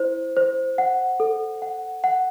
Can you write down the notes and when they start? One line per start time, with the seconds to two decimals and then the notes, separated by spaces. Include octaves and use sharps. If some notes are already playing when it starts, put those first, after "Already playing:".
Already playing: E4 C5
0.37 C5
0.78 F#5
1.20 A4
1.62 F#5
2.04 F#5